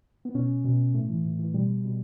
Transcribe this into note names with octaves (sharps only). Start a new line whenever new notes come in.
B3
B2 C#4
B2
A2 A3
E3
A2
E3
B2 G3
B2